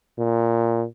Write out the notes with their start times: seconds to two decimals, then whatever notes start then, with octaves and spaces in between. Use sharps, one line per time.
0.18 A#2